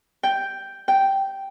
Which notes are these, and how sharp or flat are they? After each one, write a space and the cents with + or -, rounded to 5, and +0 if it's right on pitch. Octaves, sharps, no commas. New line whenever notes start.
G5 +0
G5 -5